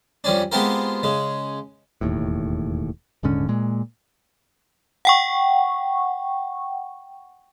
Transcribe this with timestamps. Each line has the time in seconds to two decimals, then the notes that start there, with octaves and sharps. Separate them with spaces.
0.24 F2 G3 C#4 D4
0.52 G#3 B3 C4 F4 G4 A#4
1.03 C#3 G#3
2.01 E1 D#2 A2
3.23 D#1 G#2 D3 C#4
3.49 A#2 G#3
5.05 F#5 G5 C#6